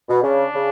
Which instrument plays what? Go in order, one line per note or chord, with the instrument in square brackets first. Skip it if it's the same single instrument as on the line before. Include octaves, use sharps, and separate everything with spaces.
[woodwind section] B2
[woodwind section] C#3 [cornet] D4
[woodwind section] C#3